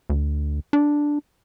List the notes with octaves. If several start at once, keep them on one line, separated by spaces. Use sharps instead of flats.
D2
D4